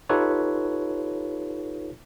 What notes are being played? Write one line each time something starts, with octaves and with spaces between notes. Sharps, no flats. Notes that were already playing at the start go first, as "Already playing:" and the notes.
D#4 F4 G4 A4 B4 C#5